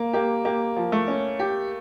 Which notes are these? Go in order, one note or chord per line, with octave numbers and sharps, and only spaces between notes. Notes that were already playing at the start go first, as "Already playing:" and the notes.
Already playing: A#3
A#3 G4
A#3 G4
F3
A3
C#4
G4